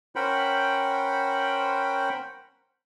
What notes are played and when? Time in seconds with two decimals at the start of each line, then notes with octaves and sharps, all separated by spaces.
0.16 C#4 A#4 C5 F#5 G5 B5